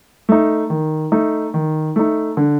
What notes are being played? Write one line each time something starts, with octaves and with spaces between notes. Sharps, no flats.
A3 D#4
D#3
A3 D#4
D#3
A3 D#4
D3